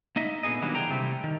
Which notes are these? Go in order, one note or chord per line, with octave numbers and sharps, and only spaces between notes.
A#3 D#4 D#5 E5
A#2 D3 B3 G#4 D#5
D#3 F#3 G3 A#3 B3 D4
C#3 E3 G#4 G5 A#5
C3 G3 A3 C4
D#3